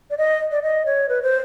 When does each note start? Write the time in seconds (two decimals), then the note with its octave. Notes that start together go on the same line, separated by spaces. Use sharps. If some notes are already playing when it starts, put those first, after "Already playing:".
0.10 D5
0.18 D#5
0.51 D5
0.63 D#5
0.86 C#5
1.09 B4
1.23 C5